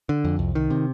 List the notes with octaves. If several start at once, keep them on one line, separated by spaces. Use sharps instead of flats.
D3
F2
C2
D#3
C3